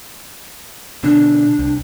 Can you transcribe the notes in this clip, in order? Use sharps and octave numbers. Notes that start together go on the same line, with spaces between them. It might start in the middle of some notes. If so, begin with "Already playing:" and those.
B2 D3 D4
C2